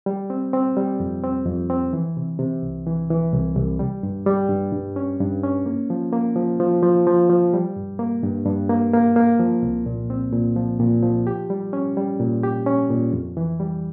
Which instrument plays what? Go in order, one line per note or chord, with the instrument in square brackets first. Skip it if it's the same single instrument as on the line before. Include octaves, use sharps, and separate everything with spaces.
[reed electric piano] G3
C4
C4
G3
F2
C4
F2
C4
E3
C3
C3
C2
E3
E3
C2
C2
G3
G2
G3
G2
G2
C#4
G2
C#4
A#3
F3
A#3
F3
F3
F3
F3
F3
G3
G2
A#3
G2
G2
A#3
A#3
A#3
F3
C2
A#2
C4
A#2
F3
A#2
F3
G4
G3
C#4
G3
A#2
G4
C#4
A#2
F2
E3
G3